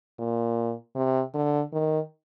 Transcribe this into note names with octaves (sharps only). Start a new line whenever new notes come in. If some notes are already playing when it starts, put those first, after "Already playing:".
A#2
C3
D3
D#3